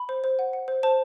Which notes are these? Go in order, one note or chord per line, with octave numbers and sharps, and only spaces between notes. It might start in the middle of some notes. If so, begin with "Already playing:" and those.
Already playing: B5
C5
C5
F#5
F#5
C5
C5 A5